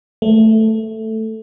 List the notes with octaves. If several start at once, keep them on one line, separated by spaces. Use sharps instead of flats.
A3